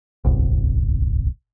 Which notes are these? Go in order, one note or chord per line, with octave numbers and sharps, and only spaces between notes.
D1 G1 C2